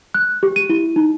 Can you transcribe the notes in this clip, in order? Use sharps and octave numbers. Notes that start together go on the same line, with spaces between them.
F#6
G4
D#7
E4
D#4